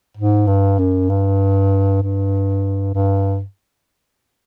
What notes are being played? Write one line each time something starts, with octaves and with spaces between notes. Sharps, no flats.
G#2
G2
F#2
G2
G2
G2